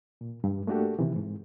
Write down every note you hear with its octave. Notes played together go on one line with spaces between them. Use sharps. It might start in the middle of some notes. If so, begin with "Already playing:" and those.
A#2
G2
A3 A#3 D4 F#4 G4 A4
C3 D#3 E3
G#2